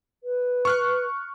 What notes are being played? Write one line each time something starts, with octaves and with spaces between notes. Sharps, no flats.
B4
C#6 F6 F#6